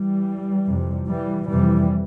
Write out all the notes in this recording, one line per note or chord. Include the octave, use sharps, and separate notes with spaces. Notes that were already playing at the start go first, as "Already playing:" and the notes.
Already playing: E3 G3
F2 C3
E3 G3
F2 C3 E3 G3